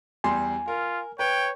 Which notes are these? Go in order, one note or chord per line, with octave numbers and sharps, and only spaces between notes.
E2 G3 G#5 C6
F4 A#4
B4 C#5 G5